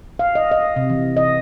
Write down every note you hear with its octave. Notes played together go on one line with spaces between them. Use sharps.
F5
D#5
D#5
C3
E3
D#5